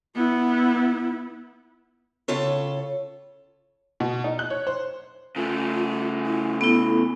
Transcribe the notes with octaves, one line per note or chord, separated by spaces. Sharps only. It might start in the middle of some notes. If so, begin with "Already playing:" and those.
B3 E4
A2 C#3 F4 A4 C#5
B2
D#4
F#6
C#5
C5
C#3 A3 F4
E4
B3 E4 A4